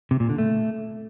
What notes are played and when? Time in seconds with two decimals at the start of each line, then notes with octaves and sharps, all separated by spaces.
0.11 C3
0.20 A#2
0.29 D3
0.38 A3